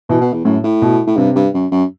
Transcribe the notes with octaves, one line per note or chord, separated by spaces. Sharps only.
B2 E3
B2
E2
F#2 A2
A2
B2
A2
G2 C3
G2
F#2
F#2